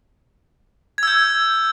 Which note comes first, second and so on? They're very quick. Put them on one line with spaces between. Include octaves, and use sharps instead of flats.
G#6 E6 G6